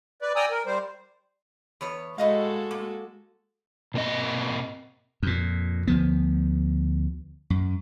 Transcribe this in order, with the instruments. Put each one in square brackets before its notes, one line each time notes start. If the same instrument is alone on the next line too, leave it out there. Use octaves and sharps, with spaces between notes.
[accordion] B4 D5
D5 G5 G#5 A#5 D#6 E6
A#4
G3 C5
[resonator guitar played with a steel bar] E2 B3 C#5
[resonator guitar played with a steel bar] A2 D#5 F5 [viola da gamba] G#3 F#4 A4
[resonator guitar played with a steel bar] A#3
[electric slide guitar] B2 A#3 C4 D#5
[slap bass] F2 A#2
D2 F3 B3
F#2